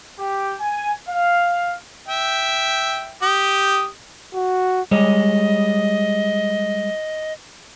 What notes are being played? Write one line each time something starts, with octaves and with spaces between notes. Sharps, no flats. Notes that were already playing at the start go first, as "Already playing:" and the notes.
G4
G#5
F5
E5 G5
G4 D#6
F#4
G3 G#3 C#5 D#5